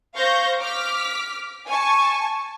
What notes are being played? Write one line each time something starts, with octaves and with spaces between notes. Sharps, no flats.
C5 F5 C#6 G6 A#6
D6 F6 B6
G#5 A5 C#6